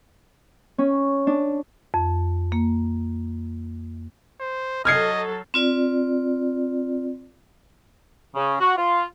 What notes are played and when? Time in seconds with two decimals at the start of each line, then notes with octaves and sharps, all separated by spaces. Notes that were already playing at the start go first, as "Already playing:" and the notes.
0.78 C#4
1.27 D4
1.94 F2
2.52 A#3
4.40 C5
4.85 F#3 A4 D#5 F6 G#6 C7
5.54 C4 F4 D5
8.35 C#3
8.60 F#4
8.77 F4